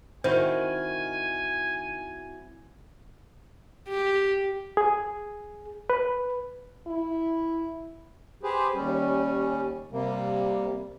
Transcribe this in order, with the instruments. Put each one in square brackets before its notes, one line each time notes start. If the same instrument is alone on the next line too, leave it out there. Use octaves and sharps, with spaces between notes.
[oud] D#3 [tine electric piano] C4 E4 F#4 [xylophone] C5 [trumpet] G#5
[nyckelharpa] G4
[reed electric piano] G#4
B4
[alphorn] E4
[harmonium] G4 G#4 B4 C5
D#2 G3 C#4
C3 G3 A#3